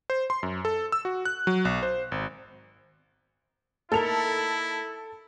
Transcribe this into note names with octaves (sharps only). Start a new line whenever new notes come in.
C5
C6
F#2
A4
E6
F#4
F#6
F#3
B1
C5
G#1
A#3 D#4 E4 A4 A#4 F7